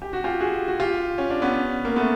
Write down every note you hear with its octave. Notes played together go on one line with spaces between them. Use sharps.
G4
F#4
F4 G4
F#4 G#4
F#4
F4 G4
C#4
D4
B3 C#4
A#3
A3 B3